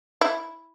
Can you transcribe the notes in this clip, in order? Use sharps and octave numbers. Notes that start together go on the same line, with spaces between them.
E4